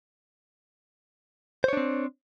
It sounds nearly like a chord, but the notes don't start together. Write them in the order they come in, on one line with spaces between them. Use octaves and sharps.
C5 C#5 D4 C4